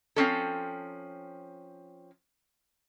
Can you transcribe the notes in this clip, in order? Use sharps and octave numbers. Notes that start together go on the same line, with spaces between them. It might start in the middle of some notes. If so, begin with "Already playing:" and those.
F3 C4 C#4 A4